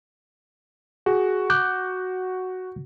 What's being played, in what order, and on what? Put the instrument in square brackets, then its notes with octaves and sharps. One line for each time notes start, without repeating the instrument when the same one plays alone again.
[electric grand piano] F#4 [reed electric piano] G#4
[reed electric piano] D6 F#6 G6